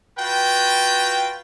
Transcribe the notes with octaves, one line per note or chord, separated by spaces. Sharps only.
F4 F#4 B4 G5